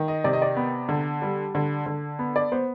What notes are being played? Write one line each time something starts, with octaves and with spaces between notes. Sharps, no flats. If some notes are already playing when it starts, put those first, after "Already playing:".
Already playing: D#3
D#5
C3 D5
D#5
D5
B3
D3
G3
D3
D3
B3
D5
B3 C5